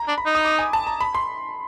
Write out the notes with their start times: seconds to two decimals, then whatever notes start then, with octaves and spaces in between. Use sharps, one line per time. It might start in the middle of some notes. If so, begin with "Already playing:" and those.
Already playing: A#5
0.08 D4
0.18 B5
0.26 D#4
0.35 D#6
0.45 D6
0.59 G#5
0.73 A5
0.87 A#5
1.01 B5
1.15 C6